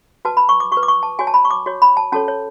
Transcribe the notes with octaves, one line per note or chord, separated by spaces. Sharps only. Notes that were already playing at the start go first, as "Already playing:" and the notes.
F#4 B4 A5
B5
C#6
D6
F#4 C#6
B4
D6
C#6
A5
F#4 C#5 G#5
A5
B5
C#6
D6
F#4 C#5
B5
A5
C#4 F#4 A4 C#5 A5
C#5